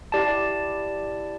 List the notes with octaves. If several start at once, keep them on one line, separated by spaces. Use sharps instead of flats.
E4 G4 D5 A5